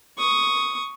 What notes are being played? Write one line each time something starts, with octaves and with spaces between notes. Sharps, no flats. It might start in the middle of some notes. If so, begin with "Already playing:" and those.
C#6 D#6